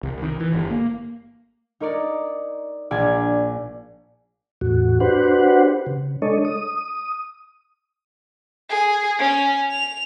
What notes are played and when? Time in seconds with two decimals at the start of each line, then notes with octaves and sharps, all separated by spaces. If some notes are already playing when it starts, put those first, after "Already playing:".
0.03 C2
0.22 D#3
0.40 E3
0.54 G1
0.70 A#3
1.80 D#4 A#4 C#5 D5
2.91 A#1 D5 G#5 G#6
4.61 E2 A2 F#4
5.00 D4 F#4 G4 B4 C5 F#5
5.86 C#3
6.22 G#3 D4 A4 C#5 D#5
6.45 D#6
8.70 G#4
9.19 C#4
9.71 F7